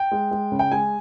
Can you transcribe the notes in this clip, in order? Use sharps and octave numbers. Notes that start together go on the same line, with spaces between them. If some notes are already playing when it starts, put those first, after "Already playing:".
Already playing: G5
G#3
G#3
C#3
G5
G#3 G#5